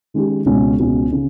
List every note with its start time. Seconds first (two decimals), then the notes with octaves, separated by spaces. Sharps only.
0.14 D#3 G#3 C#4 G4
0.46 C#2 B2 G#3 C#4
0.79 C#2 B2 G#3 C#4
1.12 C#3